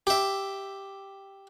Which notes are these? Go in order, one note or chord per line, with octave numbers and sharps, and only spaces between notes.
G4 E5